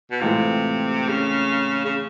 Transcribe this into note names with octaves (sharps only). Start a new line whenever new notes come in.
B2
A2 C3 E3 G#3 C4 F4
C#3
C#3